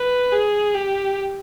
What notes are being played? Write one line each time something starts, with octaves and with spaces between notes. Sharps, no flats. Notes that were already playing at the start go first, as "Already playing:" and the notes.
Already playing: B4
G#4
G4